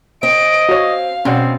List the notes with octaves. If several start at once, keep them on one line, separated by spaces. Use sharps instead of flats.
C4 D#5 D7
F#4 C#5 F5
B2 C4 C#4 D5 F#5